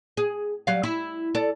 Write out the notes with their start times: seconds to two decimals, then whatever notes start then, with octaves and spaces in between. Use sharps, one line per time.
0.17 G#4
0.67 F#3 G3 F5
0.83 E4
1.35 A4 D5